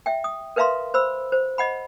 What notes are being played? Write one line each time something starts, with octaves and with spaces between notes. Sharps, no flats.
E5 G5
D#6
A#4 B4 E5 F5 A#5 C6
C5 B5 E6
C5
D#5 F#5 B5